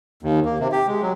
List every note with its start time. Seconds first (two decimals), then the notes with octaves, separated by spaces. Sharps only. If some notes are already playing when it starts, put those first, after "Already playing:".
0.23 D#2
0.46 A#3
0.60 C3
0.72 G4
0.87 G#3
1.02 F#3